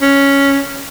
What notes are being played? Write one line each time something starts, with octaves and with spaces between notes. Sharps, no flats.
C#4